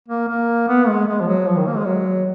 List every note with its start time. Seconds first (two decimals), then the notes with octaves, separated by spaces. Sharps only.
0.08 A#3
0.29 A#3
0.68 B3
0.88 G#3
1.07 G#3
1.21 F3
1.28 F#3
1.48 F3
1.57 D#3
1.67 A#3
1.77 G#3
1.86 F#3